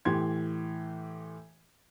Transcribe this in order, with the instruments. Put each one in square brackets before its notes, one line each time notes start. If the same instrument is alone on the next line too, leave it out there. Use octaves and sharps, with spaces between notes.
[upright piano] A2 E3 G4 C6 G#6